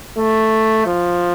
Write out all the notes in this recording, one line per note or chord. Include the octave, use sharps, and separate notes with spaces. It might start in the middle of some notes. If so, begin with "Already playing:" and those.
A3
F3